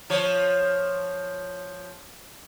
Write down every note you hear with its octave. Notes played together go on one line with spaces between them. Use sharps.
F3 C#5